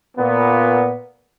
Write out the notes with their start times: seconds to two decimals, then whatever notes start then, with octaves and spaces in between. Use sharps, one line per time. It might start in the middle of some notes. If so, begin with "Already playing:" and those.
0.17 A#2 B3